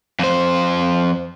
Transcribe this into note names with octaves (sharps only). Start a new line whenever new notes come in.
F2 C5